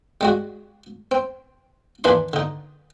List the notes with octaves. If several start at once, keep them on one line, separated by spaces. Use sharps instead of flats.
G3 G#3 F#4
C4
D#2 E3 D4 B5 C6
D3 D#4